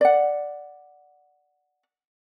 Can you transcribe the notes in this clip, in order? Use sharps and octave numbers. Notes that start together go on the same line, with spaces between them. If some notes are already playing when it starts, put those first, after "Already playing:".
D5 F#5